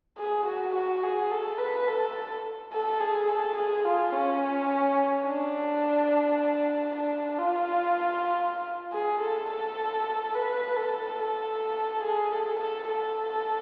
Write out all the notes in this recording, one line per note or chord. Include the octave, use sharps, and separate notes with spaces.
G#4
F#4
F#4
G#4
A4
B4
A4
A4
G#4
A4
G#4
F4
C#4
D4
D4
F4
G#4
A4
A4
B4
A4
A4
G#4
A4
A4
A4